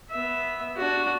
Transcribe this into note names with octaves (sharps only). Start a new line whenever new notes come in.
B3 E5
D4 F#4